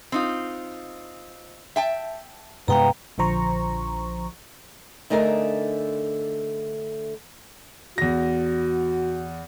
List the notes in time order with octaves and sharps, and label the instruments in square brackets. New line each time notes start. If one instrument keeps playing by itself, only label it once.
[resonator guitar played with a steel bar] C4 D#4 F4
E5 G5 A5
[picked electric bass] G2 C3 G#3 [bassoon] B3 [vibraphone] F5 G5 A#5
[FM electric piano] A#1 D3 F3 C5 A#5 C#6
[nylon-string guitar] D3 A3 D#4 G#4 A#4
[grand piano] E2 A#6 [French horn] F#4